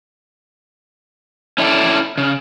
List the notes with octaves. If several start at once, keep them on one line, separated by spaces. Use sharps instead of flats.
C#4 E4 A4 D5
C#3